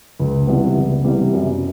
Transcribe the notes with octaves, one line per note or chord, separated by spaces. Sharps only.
C#2
C3 E3 G3 B3
C#2
C3 E3 G3 B3
F#2